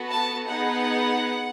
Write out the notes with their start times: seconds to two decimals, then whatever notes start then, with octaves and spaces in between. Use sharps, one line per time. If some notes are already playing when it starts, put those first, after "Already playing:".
Already playing: B3 F#4 A4
0.09 A5
0.48 B3 D#4 G#4 F#5